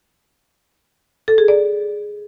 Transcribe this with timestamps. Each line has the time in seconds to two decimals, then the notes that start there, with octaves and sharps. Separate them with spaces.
1.28 A4
1.38 G#4
1.48 D5